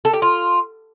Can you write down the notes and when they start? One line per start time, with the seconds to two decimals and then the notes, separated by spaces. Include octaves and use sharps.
0.05 A4
0.13 G4
0.22 F4